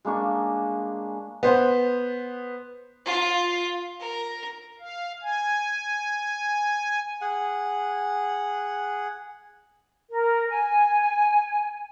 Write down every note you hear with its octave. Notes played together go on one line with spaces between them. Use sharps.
G#3 A#3 D4 C#6
B3 C5
F4
A#4
F5
G#5
G#4 F#5
A#4
G#5